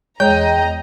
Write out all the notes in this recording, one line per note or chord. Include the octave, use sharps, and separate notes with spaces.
E2 G#3 C#5 D#5 G5 A#5